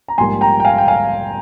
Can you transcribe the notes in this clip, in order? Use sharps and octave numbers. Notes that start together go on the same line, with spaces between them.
A#5
A#1 G#2 G3 A#3 G#5 C6
G5 A#5
G5
F5 G#5
G5
F5 G#5